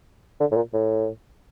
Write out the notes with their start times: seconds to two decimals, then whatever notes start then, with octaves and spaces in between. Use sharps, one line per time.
0.41 D3
0.52 A2
0.56 A#2
0.73 A2